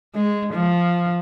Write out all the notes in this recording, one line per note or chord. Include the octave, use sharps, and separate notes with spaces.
G#3
F3